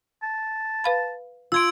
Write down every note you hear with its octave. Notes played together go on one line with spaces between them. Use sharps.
A5
B4 F5 B5
F4 C6 E6 G#6 D7